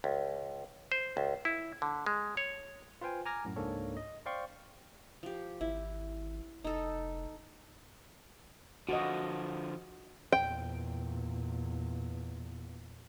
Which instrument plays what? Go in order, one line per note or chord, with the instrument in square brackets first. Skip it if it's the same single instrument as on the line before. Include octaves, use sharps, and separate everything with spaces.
[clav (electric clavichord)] C#2
C5
C#2
E4
D3
G#3
C#5
[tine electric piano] F4 B4 C5 F5 G5 G#5
G#5 A#5 D6 F6 G#6 A#6
F#2 A2
C#2 G#2 A#3 D4 A4 C#5
D#5
C5 D5 F5 G5 C6 C#6
[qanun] F3 G4
[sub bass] G#1 [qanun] E4
[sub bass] F1 [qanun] D#4 A4
[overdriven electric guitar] D3 F3 [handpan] F#4 D#5
[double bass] E2 A#2 [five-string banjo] G5